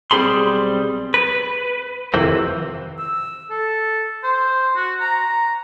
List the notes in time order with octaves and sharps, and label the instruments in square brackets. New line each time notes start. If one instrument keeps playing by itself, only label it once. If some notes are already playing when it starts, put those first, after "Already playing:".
[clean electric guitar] B1 G3 C4 G#4 B5 C6
B4
F2 C3 D#3 E3 C4
[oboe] E6
A4
C5
F#4
A#5